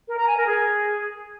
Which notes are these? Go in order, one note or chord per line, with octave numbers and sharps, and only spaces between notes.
A#4
A#5
G#5
A#4
G#4